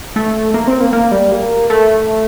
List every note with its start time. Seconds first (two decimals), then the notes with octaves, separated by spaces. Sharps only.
0.16 A3
0.54 A#3
0.67 C4
0.80 A#3
0.93 A#3
1.12 G3
1.32 A#3
1.70 A3